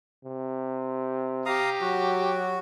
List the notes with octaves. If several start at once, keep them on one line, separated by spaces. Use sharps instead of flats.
C3
G4 F5 A#5 D#6
F#3 F#4